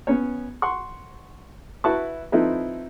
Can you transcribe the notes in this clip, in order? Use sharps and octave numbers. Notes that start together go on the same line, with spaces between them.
B3 C#4 C#5
F#5 C6 C#6
E4 F#4 B4 A5 C#6
F3 C4 D#4 E4 A4 B4